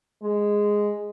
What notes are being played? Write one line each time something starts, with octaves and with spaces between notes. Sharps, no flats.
G#3